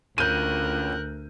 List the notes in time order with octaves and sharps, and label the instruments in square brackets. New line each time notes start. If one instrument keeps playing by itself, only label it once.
[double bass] D2 [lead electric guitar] C#3 F4 [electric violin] A#4 F#6 [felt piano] G6 D#7